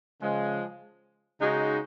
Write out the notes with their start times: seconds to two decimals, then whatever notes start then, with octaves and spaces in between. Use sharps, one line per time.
0.22 C#3 F3 G#3
1.38 C#3 G#3 D#4 F#4